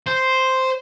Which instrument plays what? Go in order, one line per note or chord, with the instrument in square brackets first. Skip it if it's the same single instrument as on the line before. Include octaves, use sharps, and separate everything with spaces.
[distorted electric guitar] C5